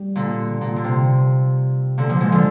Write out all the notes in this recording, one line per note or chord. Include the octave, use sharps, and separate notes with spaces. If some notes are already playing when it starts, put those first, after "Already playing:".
Already playing: G3
A#2 D3
A#2
D3
C3
A#2 D3
D3 F3
F3 G#3
D3 F3